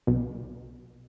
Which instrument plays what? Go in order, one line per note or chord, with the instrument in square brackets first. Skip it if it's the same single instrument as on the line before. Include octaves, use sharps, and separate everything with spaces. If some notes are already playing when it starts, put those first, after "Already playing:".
[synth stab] B1